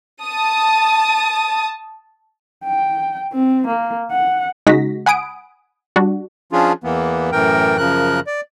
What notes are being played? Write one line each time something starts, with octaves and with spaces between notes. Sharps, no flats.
A5 D#6
G5
C4
A#3
F#5
C#3 G#3 D#4 F#4 A#6 B6
F#5 G#5 B5 D#6 D7
G3 D4 F#4
F3 C#4 D4 F4 G#4
E2 E3 A#3 B3
F#2 A2 E3 A#4 G5
F#2 C#3 F3 A#4 F#6
D5